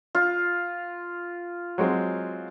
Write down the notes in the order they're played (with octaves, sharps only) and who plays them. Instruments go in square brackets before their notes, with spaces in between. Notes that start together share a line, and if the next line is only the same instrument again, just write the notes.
[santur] F4
[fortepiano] F#3 G#3 C4